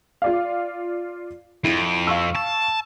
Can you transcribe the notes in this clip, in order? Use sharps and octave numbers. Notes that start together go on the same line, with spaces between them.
F4 D5 F5
F2 E4
F5 C#6 E6
A5